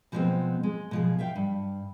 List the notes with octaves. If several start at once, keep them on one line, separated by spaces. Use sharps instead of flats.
B2 F3 G3 G#3 B3 C4
G#3
B2 F3 G#4
E5 F5 G5
G2